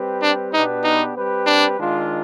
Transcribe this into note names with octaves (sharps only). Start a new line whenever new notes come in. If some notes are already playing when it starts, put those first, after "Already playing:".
Already playing: G3 C4 G4 B4
D4
B2 B3 D4 D#4 G4 B4
D#4
G3 C4 G4 B4
D4
D#3 G#3 D4 F4